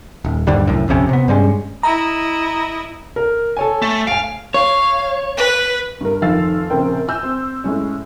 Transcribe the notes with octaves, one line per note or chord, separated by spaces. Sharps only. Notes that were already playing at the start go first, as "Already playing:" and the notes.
D#1
D#2 G#2 D3 G3
C2 F#2 A2
A#1 F2 C3 C#4
C3 B3
G2 G3 G#3 C#4
E4 D#5 A#5
A#4
A4 C#5 G#5
A3
F5 G#5 D7
C#5 F5
B4
G2 A#4
F1 D#3 F3 F5 E6 A6
A#1 C#3 C4 A#4 G5
G#5 E6 G6
C4
A2 G#3 C#4